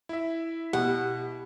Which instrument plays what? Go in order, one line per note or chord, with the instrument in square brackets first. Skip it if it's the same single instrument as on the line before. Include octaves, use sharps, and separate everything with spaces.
[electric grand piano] E4 E5
[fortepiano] B2 [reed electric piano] G4 [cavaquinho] F#5